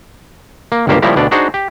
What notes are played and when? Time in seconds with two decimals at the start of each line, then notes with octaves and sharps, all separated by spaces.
0.72 A#3
0.87 G1 C#2 G2 A#3 G4 C5
1.02 C#3 F3 G3 A#3 E4 A#4
1.16 D2 B2 D4 D5
1.31 D4 D#4 F#4 G#4 C5
1.54 G4